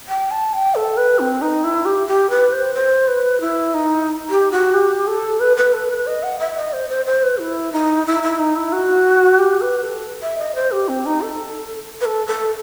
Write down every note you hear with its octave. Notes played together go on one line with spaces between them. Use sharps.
G5
A5
G5
A4
B4
C4
D#4
E4
G4
G4
B4
C5
C5
B4
E4
D#4
G4
F#4
G4
A4
B4
B4
A4
B4
D#5
F#5
E5
D#5
C5
C5
C5
B4
E4
D#4
E4
E4
D#4
E4
F#4
G4
B4
A4
E5
D#5
C5
G4
C4
D#4
A4
B4
A4
A4